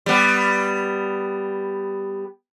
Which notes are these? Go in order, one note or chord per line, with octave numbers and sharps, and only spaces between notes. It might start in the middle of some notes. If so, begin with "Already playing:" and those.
G3 B3